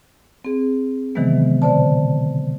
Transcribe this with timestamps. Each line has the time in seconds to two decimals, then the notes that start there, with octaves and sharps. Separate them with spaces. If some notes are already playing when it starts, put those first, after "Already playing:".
0.45 C4 G#4
1.15 C3 D#3 E3 F#3 G#3 B3
1.62 B2 D3 C5 D5 A5